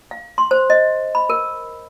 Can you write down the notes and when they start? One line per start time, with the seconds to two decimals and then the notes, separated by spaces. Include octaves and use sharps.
0.11 F5
0.38 C6
0.51 C5
0.70 D#5
1.15 B5
1.30 A#4